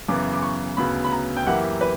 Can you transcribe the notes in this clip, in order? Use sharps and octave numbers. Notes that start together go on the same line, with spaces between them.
F#2 C#3 E3 B3 D6
D6
C#6
D2 C#3 F#3 B3 B5
B5
A#5
G5
F#2 E3 A#3 E4 G4 F#5
B4